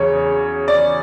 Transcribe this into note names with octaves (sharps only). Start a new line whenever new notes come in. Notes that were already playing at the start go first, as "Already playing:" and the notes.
Already playing: E2 C#3 F#3 C#5
D5